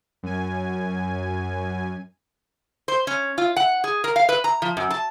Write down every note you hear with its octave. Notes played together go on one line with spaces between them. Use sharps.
F#2 G#5
C5
C#4
F4
F#5
G#4
A#4
F5
B4
A#5
F3
F#2
A5